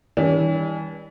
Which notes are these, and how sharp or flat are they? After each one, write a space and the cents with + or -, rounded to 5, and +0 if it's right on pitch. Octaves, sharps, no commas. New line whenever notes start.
E3 -30 G3 +20 C#4 +45